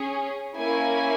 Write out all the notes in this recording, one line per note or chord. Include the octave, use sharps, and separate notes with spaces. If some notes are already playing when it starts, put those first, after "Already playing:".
Already playing: C#4 G#4
A#3 C#4 E4 G#5